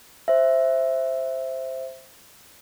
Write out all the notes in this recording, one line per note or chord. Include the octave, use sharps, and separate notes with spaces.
C5 E5